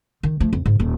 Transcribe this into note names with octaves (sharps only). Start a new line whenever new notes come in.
D#3
F3 A3
F2
G#2
D#1